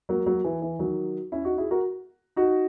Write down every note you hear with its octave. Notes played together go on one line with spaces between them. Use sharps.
F#3 A#3
F#3 A#3
E3
E3
D#3 F#3
C#4 E4
D#4 F#4
E4 G#4
F#4 A#4
D#4 F#4